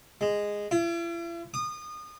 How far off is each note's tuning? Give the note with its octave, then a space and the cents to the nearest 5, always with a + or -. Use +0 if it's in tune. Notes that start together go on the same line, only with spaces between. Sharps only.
G#3 -10
E4 +45
D#6 -30